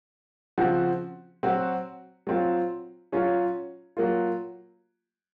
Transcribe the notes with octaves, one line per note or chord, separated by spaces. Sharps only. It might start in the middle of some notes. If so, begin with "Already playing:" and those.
C#3 F3 C4 F#4
F#3 C4 F#4
F#3 C4 F4
F#3 C#4 F4
F#3 A#3 F4